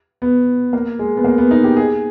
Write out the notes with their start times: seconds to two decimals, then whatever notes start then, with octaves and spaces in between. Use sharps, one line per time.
0.22 B3
0.73 A#3
0.99 G#3
1.17 B3
1.25 A#3
1.38 B3
1.51 D#4
1.64 G4
1.77 G#4